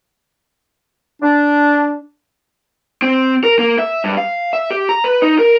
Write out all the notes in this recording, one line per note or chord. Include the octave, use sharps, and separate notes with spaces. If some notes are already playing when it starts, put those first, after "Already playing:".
D4
C4
A#4
A#3
E5
G2
F5
E5
G4
A#5
B4
D#4
A#4